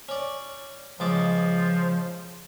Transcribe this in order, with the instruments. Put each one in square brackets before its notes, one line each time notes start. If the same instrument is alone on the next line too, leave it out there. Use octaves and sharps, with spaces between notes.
[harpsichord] C#4 D5
[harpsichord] C#2 G#3 D6 [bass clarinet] F3